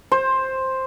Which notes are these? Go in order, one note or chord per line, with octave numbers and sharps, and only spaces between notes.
C5